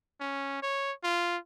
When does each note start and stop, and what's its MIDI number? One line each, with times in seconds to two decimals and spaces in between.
0.21 0.59 61
0.63 0.93 73
1.04 1.37 65